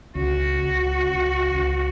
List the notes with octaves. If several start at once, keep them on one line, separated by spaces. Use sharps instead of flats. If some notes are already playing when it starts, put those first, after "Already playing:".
C#2 F#4
C#2
C#2
C#2